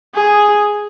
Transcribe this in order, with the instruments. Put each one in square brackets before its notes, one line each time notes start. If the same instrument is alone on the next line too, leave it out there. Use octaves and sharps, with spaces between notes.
[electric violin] G#4